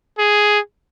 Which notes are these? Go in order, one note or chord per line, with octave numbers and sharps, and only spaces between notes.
G#4